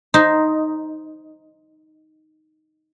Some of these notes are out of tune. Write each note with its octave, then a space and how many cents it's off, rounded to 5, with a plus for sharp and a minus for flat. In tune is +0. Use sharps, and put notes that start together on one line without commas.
D#4 +0 C5 +0